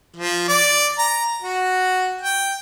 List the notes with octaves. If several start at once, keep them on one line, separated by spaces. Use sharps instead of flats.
F3
D5
A#5
F#4
G5